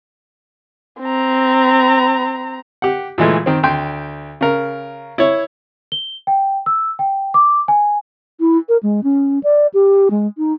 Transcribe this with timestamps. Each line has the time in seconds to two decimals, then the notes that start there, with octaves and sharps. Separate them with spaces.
1.01 C4 A#5
2.82 G4 F#5
3.18 A#2 E3 G#3 A3
3.46 D#3 C4
3.63 D2 G5 C6
4.41 C#3 A#4
5.18 E4 C#5
5.92 G7
6.27 G5
6.66 E6
6.99 G5
7.34 D6
7.68 G#5
8.40 E4
8.69 A#4
8.83 G#3
9.04 C#4
9.43 D5
9.74 G4
10.11 G#3
10.38 D#4